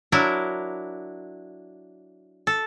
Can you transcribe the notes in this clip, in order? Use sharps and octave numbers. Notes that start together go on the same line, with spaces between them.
F#3 D4 E4 A#4
A4